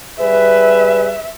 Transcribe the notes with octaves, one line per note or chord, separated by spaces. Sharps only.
G3 G#4 B4 E5